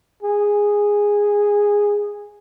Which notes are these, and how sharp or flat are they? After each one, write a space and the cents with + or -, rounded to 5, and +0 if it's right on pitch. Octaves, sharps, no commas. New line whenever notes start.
G#4 -10